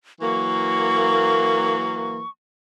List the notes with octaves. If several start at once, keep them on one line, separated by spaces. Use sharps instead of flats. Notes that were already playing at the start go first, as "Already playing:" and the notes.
E3 F#3 A#3 C#6